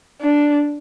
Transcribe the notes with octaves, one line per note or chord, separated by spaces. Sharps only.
D4